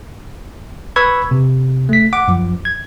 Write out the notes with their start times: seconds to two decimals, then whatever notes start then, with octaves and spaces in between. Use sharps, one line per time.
0.96 B4 B5 C#6 E6 G#6
1.31 C3
1.89 A3 B6
2.13 F#5 D6
2.28 F#2 F3
2.65 G#6